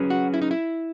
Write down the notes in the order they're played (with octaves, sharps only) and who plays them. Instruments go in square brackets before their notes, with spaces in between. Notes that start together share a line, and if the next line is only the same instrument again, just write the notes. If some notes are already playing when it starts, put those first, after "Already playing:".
Already playing: [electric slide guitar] F#3 C#4 G#4 B4
[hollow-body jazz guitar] F#4
E4
D#4
E4